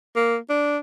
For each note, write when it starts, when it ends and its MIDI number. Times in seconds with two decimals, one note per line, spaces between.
0.16 0.37 58
0.49 0.77 62